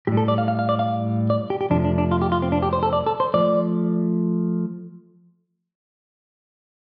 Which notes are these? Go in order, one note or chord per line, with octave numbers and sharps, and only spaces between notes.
A2 G3 G4
A4
D5
F5
F5
F5
D5
F5
D5
G4
G4
F2 C3 F3 A3 D4
D4
D4
F4
G4
F4
C4
D4
G4
C5
A4
D5
A4
C5
F3 A3 D5